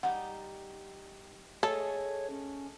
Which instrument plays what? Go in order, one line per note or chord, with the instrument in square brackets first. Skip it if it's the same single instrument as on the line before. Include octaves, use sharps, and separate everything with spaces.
[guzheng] G3 D#4 [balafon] F#5
[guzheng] A3 G#4 D#5 [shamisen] A4 [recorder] C#5
[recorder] C#4